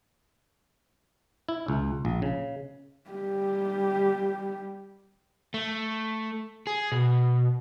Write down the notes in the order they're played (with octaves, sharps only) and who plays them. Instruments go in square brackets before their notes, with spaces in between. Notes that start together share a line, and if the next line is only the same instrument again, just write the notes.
[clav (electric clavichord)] E4
C#2
A#1
C#3
[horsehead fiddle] G3 G4
[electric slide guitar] A3
G#4
B2